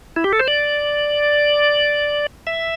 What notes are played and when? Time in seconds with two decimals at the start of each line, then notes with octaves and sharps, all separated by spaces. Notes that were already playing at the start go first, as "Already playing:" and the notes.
0.16 E4
0.24 G4
0.33 A4
0.40 C5
0.48 D5
2.47 E5